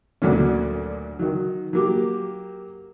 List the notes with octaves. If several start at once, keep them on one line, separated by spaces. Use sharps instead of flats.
D2 A#2 F#3 C#4
D#3 F#3
F#3 A#3 G4